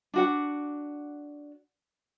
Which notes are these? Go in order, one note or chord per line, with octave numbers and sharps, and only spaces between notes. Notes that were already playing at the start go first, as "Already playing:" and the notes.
D4 F#4 F#5